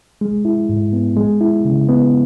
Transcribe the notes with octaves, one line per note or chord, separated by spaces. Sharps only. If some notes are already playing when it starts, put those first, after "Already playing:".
G#3
E4
G#2
B3
G#3
E4
C#3
B3